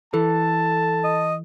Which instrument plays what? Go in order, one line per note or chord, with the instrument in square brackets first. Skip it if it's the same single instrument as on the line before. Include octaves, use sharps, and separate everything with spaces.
[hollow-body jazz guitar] E3 [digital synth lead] A4 [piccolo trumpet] A5
[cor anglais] D#5